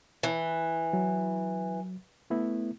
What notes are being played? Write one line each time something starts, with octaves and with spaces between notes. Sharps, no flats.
E3
F#3
A3 B3 E4